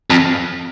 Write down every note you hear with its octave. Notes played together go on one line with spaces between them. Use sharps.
F2